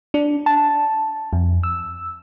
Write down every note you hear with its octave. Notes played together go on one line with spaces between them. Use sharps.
D4
A5
F2
E6